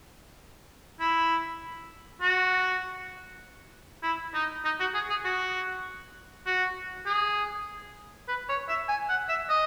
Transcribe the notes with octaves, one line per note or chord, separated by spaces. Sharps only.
E4
F#4
E4
D#4
D#4
F#4
G#4
G#4
F#4
F#4
G#4
B4
C#5
E5
G#5
F#5
E5
D#5